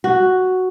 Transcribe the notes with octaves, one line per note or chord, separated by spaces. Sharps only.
F#4